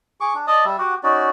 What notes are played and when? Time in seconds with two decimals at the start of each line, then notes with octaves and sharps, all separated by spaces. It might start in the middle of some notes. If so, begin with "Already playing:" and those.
0.21 G#4 C#6 D6
0.34 D4
0.47 D5 D#5 A5 D#6
0.65 G3 E5
0.78 F#4 G4 F#5
1.03 C#4 D#4 F#4 D5